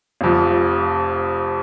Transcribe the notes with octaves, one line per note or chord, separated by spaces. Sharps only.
F1 F2 F3